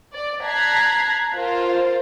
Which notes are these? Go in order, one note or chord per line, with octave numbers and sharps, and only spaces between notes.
D5
A5 A#5 F#6 G#6 B6 C7
F4 A#4 C5